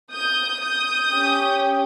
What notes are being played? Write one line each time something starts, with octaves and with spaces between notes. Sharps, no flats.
D#6 G6
D#6 G6
C#4 G4